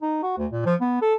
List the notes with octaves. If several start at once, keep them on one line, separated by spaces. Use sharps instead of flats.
D#4
F#4
D2
A#2
F3
B3
A4